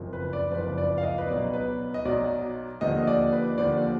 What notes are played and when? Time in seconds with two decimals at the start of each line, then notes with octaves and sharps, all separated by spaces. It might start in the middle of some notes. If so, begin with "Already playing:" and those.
Already playing: F#1 F2 F3
0.13 B4
0.33 D5
0.51 F#1 F2 F3 B4
0.78 D5
0.98 F5
1.03 D#5
1.18 B4
1.28 B1 B2 F#3 D5
1.53 B4
1.94 D#5
2.04 B1 B2 F#3 D5
2.81 D#2 D3 F3 D#5
3.03 D#5
3.07 D5
3.33 B4
3.58 D#2 D3 F3 D5